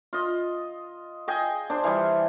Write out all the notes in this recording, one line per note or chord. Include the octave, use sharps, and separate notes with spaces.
F4 D#5
G#4 D#5 G5 G#5
D4 C5
E3 G3